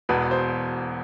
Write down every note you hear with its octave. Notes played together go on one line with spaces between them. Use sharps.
E1 E2 B2 B4
C5